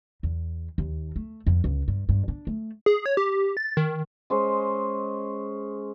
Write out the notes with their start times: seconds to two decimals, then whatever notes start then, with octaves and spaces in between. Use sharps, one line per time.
0.23 E2
0.78 D#2
1.16 A3
1.47 F2
1.64 C#2
1.88 G2
2.09 G2
2.28 D4
2.47 A3
2.86 G#4
3.06 C#5
3.17 G4
3.57 A6
3.77 D#3
4.30 G#3 C#4 C5 D#5